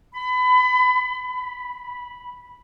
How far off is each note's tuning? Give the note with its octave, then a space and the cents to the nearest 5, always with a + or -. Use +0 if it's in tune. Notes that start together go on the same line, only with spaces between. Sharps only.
B5 +30
B5 -5